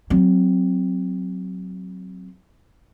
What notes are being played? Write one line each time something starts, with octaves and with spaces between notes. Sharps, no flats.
F#3 C4